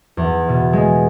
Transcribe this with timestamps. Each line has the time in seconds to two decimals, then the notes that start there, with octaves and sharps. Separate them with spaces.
0.17 E2
0.48 B2
0.73 G#3